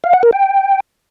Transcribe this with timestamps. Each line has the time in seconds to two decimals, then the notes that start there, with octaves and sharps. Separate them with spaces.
0.04 F5
0.13 F#5
0.23 A#4
0.33 G5